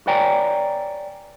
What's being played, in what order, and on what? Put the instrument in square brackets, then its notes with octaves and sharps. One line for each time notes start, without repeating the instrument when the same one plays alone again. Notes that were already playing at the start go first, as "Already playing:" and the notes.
[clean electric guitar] B4 C#5 D5 G5 G#5 A#5